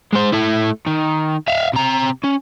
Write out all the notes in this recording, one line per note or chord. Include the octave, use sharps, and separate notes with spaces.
G#3 C5
A3 E4
D#3
E5 F5
C3 A#5
C#4